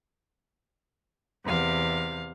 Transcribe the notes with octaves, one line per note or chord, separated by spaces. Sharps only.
E2 C3 F5